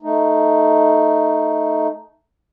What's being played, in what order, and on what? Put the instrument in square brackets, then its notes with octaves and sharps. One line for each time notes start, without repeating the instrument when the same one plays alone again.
[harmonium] A3 D#4